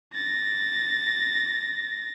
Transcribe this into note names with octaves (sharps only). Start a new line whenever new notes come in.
A6 A#6